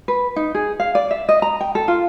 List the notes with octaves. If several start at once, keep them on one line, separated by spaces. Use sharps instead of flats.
B4
D#4
G#4
F5
D5
E5
D#5
A#5
G5
A4
F4